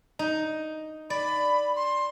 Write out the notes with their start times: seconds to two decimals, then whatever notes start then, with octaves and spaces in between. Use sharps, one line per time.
0.19 D#4
1.10 D5 B5
1.76 C6